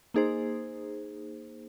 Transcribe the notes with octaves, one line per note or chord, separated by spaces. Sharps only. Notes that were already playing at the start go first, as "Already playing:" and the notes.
A#3 D#4 G#4 C5